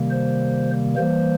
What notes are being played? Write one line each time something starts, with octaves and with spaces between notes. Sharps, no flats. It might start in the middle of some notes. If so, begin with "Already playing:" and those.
Already playing: C3 D#3 G3 A#3
C5
E3 G3 A#3 C5